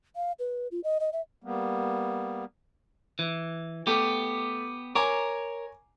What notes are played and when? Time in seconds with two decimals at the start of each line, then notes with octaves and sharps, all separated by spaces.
0.16 F5
0.39 B4
0.71 F4
0.84 D#5
1.00 D#5
1.13 E5
1.44 G3 A#3 B3
3.19 E3
3.87 A3 B3 G4
4.95 A#4 C#5 G#5 A#5 D6